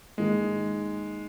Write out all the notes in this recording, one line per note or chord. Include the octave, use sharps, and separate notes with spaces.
G#2 D#3 G#3 A#3